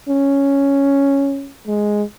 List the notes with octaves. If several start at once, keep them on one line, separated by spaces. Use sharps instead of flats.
C#4
G#3